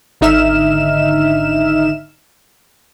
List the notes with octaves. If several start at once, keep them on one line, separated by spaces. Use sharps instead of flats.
G#1 D3 D#4 E5 F6 E7